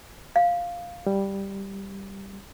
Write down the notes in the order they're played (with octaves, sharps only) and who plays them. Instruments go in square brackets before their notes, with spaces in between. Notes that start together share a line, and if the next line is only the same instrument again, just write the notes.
[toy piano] F5
[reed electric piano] G3